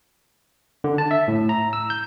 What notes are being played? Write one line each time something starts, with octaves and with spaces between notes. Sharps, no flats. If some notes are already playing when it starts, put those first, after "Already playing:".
D3
A5
E5
A2
A#5
E6
G6